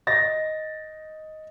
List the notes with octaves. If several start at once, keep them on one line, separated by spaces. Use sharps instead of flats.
D#5 A6 A#6